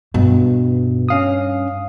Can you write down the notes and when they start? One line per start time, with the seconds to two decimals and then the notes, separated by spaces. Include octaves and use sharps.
0.14 G2 B2
1.09 C#4 F5 D#6